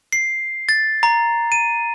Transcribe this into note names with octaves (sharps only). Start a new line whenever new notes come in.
C7
A6
A#5
D#7